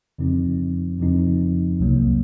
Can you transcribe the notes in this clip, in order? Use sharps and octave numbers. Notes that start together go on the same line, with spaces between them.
F2 C#3 F3 C4 D#4
F2 C#3 F3 C4 D#4
C2 C3 F#3 A#3